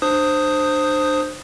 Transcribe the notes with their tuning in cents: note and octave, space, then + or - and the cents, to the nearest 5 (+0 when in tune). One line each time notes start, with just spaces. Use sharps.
D4 +35 C5 +0 D#6 +0